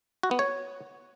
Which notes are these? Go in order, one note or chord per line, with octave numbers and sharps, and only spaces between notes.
F#4
B3
C#5